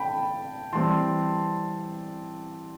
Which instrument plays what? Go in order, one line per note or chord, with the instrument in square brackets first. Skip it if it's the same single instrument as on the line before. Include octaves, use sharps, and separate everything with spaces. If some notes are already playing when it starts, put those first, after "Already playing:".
Already playing: [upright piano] G5 A5 B5
E3 G3 C4 A5 C6